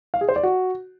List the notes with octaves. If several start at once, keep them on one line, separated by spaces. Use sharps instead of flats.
F5
G#4
C5
D5
F#4